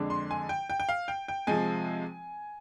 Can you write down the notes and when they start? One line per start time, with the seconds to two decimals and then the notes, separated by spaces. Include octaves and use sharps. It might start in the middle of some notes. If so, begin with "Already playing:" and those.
Already playing: F2 D3 G#3 D4
0.10 C6
0.31 G#5
0.49 G5
0.70 G5
0.80 G5
0.89 F5
1.08 G5
1.28 G5
1.47 C3 F3 G#3 G#5